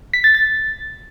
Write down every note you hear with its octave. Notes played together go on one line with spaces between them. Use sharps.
B6
A6
A6